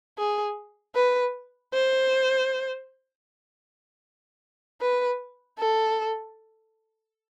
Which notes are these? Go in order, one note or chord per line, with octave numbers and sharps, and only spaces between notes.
G#4
B4
C5
B4
A4